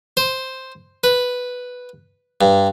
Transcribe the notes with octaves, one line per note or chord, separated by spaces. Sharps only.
C5
B4
G2